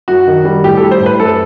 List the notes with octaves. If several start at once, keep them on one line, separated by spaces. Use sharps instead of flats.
F#2 F#4
D#3
G3
A2 G4
G3 A4
C5
A2
B4
F#2 A4